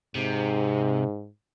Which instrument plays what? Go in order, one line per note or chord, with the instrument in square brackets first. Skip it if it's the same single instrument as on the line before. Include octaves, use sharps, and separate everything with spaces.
[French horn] G#2 [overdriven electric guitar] C3